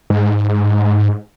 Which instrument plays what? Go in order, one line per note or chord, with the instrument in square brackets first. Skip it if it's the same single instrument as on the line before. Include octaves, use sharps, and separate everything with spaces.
[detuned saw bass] G#2